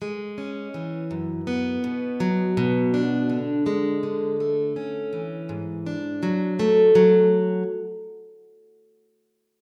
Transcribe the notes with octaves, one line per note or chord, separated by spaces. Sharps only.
G#3
C#4
E3
F#2
B3
B2
F#3
B2
D4
D3
G#3
D3
A3
C#4
E3
G#2
D4
F#3
A3
F#3